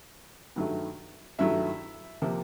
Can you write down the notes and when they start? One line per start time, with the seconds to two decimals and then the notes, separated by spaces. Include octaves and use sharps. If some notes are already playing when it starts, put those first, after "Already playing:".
0.56 G2 D#3 F#3 A3
1.39 G2 D#3 F#3 A3 E4 E5
2.22 C3 F3 A#3